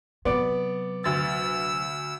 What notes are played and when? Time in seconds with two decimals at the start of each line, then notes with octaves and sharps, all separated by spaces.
0.25 C3 F#3 B3 D5
1.04 D2 E6 A6